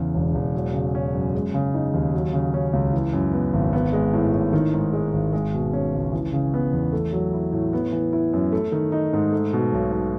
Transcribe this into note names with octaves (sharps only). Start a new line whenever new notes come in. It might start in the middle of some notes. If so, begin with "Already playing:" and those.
Already playing: E2 C#3
E1
E1
F#3
C#3
C#4
F#2
G#3
C#3
D#4
D#2
F#3
C#3
C#4
C#2
E3
F#2
B3
G#1
B3
G#3
A2
A2
D#3
G#2
G#3
G#1
G#3
B2
C#4
C#2
E3
C#3
B3
E2
A3
F#3
E4
A2
B3
E3
E4
F#2
A3
D#3
D#4
G#2
A3
B2
B1
B1